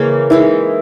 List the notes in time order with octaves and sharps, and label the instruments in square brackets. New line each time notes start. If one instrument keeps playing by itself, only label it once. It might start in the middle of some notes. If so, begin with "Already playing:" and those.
Already playing: [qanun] C#3 E3 A#3 C#4 G#4
[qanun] E3 G#3 D#4 [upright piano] E4